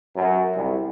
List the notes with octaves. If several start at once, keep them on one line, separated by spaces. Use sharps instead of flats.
F#2
C2